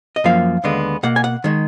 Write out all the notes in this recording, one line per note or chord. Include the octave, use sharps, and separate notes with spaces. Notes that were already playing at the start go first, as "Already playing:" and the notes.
D#5
F#2 F3 A#3 F5
D#2 D3 G#3 B3
B2 A#3 F#5
G#5
F#5
D#3 G#3